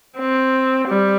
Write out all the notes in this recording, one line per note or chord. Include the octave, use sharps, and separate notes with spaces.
C4
G3